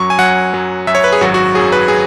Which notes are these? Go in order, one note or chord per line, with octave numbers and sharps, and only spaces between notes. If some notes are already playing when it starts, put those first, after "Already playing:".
Already playing: F#2 F#3 C#6
G#5
F#2 F#3 F#5
F#2 F#3
F#2 F#3 E5
C#5
B4
G#4
G#1 F#2 F#3 F#4
F#4
G#1 F#2 F#3 G#4
B4
F#3 G#4